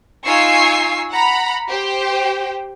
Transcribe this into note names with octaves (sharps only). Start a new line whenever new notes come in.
D#4 F4 G#5 C#6 E6 C7
F#5 A#5 B5
G4 C5 G5